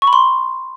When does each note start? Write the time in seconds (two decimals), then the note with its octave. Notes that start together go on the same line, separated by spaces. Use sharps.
0.02 C#6
0.07 B5
0.13 C6